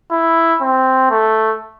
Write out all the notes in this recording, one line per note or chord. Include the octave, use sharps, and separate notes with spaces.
E4
C4
A3